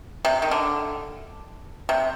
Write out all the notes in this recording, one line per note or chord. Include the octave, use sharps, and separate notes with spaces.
C3
D#3
D3
C3